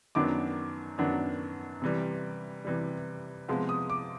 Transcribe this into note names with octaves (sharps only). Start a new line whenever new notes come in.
F#2 D#3 F#3 B3 D4 D6
F#2 D#3 F#3 B3 D4
C3 E3 G3
C3 E3 G3
C3 F3 G#3 B3
D#6
D6